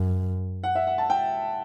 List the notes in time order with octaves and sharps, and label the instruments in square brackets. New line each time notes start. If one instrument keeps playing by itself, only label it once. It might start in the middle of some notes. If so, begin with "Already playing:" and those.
Already playing: [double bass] F#2
[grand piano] F#5
E5
F#5
A5
G5